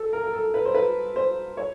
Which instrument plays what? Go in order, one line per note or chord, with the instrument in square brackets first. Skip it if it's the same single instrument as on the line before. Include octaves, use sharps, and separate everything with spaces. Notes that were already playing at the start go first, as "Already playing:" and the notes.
Already playing: [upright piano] A4
A#4
A#4
A4
B4
C5
B4
C5
C#5